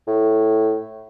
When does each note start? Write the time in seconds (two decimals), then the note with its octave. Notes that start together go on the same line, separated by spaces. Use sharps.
0.07 A2